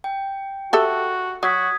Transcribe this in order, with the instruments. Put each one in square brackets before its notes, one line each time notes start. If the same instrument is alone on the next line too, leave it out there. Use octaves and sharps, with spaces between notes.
[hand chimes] G5
[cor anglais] F#4 [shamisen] G4 A4 E5
[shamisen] F#3 [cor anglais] F#4 [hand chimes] D#6 G#6 B6